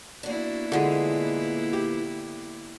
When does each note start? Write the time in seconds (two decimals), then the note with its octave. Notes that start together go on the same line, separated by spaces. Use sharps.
0.23 A#3 B3 D4 E4 F#4
0.72 A#2 D3 E3 G#3
1.73 G4